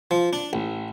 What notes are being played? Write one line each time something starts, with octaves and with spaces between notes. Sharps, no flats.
F3
D4
A1